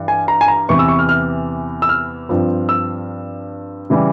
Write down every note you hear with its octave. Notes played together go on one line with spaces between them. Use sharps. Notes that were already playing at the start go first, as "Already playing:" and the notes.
Already playing: G2 E3
G#5
A#5
G#5
A#5
E2 C3 E3 C#6
E6
C#6
F6
F6
E6
F6
G2 F3 C4
E6
C#3 E3 G3